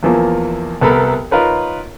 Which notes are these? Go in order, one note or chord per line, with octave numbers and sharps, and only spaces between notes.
E2 E3 F3 A#3
C2 B3 A4 A#4 B5
D#4 F4 A#4 B4 C#5